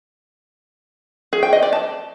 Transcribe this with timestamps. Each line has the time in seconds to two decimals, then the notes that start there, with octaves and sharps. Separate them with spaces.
1.33 G#4
1.43 G5
1.53 D#5
1.63 D5
1.73 A5